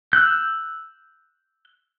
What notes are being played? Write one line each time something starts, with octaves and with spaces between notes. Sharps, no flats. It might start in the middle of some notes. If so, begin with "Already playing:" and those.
E6 F#6 G6